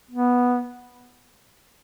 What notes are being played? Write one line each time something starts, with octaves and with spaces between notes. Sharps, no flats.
B3